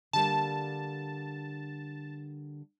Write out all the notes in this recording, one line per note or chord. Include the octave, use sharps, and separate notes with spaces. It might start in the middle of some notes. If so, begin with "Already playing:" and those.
D3 G3 A#3 A5